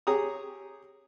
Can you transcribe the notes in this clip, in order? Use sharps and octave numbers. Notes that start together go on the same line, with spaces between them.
G4 G#4 C#5 A#5 D#6